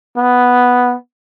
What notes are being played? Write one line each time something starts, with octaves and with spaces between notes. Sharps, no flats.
B3